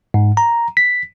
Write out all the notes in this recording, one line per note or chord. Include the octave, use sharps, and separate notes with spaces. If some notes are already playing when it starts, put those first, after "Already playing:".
G#2
A#5
B6